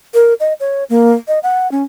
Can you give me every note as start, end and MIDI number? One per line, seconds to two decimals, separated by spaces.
0.14 0.34 70
0.40 0.53 75
0.60 0.84 73
0.90 1.13 58
1.28 1.39 75
1.43 1.70 78
1.72 1.83 61